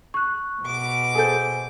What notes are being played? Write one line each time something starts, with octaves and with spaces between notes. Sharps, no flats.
C#6 F#6
B2 D6
G#4 A4 C5 G#5